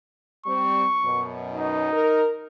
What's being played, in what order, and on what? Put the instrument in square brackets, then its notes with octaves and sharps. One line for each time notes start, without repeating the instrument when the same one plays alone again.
[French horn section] G3 C4 [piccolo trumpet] C#6
[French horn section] F#2 B2
[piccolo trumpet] D#4
[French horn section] A#4